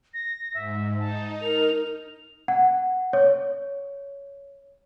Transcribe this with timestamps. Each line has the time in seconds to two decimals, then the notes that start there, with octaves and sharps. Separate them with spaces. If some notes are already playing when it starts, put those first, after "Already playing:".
0.14 A#6
0.54 G#2 E5
0.99 D#4 A5
1.41 A#4 F7
2.48 F#5
3.13 C#5